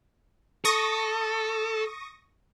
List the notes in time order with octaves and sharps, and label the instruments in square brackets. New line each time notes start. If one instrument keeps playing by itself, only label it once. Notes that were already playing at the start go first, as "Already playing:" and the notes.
[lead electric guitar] A4 [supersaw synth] C#6 D#6 A#6